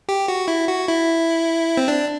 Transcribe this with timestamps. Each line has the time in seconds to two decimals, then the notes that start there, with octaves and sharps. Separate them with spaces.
0.09 G4
0.28 F#4
0.48 E4
0.68 F#4
0.88 E4
1.77 C4
1.88 D4